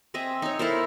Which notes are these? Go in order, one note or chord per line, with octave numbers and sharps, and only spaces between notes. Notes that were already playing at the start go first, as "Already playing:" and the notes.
C4 D#5 E5 G#5
D#4 C#5
E4 A4 A#4 C5